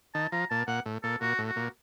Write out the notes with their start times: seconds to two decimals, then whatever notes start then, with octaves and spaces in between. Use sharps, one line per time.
0.15 D#3 A5
0.32 F3 A#5
0.50 A#2 A5
0.68 A#2 F#5
0.85 A2
1.03 A#2 A4
1.21 A#2 F#4
1.39 A2
1.48 F#4
1.56 A#2